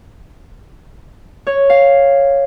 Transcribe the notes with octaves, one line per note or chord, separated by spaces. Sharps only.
C#5
F5